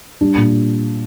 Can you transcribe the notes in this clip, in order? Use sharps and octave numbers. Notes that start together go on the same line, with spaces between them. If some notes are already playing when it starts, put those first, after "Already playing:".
G3 D4
A#2